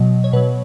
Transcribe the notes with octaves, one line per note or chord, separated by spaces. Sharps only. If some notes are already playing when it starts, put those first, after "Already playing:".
Already playing: B2 F#3 D#5
C#5
B2 F#3 B4